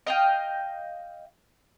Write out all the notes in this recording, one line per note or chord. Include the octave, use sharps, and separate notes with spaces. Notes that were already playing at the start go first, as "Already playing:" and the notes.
D#5 F5 G5